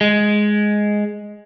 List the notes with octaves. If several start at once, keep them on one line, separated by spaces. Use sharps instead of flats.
G#3